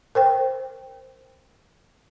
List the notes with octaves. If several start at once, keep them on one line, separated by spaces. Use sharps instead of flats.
A#4 C5 G5